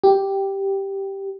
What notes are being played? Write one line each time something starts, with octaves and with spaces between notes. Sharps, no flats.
G4